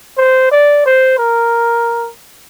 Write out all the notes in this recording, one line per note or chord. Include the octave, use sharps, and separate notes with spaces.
C5
D5
C5
A#4